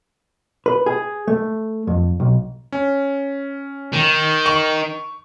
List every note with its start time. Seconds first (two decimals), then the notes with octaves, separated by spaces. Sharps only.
0.66 B4
0.86 G#4
1.28 A3
1.87 F2
2.20 B1
2.72 C#4
3.93 D#3
4.46 C#6